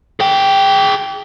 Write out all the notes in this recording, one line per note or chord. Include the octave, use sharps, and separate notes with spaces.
G#4 G5